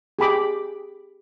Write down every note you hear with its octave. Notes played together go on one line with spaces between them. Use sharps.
G4 G#4 B5 D6